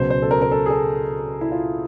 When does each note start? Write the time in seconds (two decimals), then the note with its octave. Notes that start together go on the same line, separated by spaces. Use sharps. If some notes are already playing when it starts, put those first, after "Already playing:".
Already playing: C#2 B2 F#3 C5
0.10 C5
0.22 A4
0.31 A#4
0.42 A#4
0.51 A4
0.66 G#4
0.70 A4
1.41 E4
1.52 F4